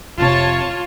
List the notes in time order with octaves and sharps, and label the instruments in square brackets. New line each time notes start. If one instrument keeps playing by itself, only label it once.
[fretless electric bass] F1 A2 C3 [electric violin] F4 [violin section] C#5 A5